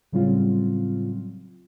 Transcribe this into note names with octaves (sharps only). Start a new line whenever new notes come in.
A2 C#3 F#3 G3 C4 F4